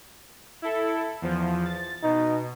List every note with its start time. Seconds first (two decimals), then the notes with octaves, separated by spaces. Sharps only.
0.62 E4 A4
1.22 E2 F3
1.65 A6
2.03 B2 D#4